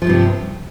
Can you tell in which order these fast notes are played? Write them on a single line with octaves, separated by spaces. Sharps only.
F3 E2 G2 C3